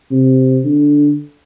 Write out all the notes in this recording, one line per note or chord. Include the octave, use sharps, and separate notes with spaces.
C3
D3